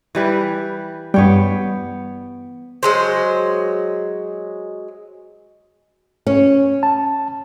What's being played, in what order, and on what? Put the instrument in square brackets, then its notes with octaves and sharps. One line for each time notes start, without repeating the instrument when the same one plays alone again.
[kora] E3 G3 B4
[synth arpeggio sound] G2 G3 [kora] B3 C#5 G5
[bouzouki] F#3 G#3 C5
[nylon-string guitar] C#4
[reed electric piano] A5